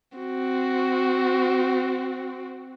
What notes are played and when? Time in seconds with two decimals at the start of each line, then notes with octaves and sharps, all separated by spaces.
0.18 C4 F#4